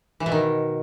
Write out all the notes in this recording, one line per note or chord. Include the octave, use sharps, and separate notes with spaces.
E3
B2
D#3